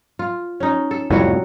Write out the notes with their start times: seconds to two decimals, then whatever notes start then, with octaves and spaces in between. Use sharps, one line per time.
0.19 F4
0.60 C#4 D#4
0.91 A4
1.10 C2 F2 A2 F#3 G3 F#4